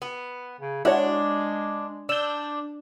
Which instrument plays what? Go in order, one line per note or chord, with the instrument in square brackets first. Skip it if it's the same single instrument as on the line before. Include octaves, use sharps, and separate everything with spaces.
[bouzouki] B3
[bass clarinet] C#3
[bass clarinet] G#3 [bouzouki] D4 [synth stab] E4 F#4 C#5
[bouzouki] D4 [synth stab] E6 G6